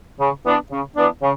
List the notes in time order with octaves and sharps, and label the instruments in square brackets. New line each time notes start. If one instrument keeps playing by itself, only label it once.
[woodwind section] C#3
E3 B3 D4
C#3
E3 B3 D4
C#3